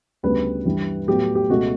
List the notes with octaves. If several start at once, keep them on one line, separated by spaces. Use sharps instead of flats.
D2 C#3 G3 B3 B4
G2 E3 G3
A2 F#3 B3 G4
G4
C#2 B2 A3 F#4